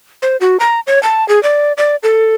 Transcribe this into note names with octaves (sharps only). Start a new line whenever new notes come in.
C5
F#4
A#5
C#5
A5
G#4
D5
D5
A4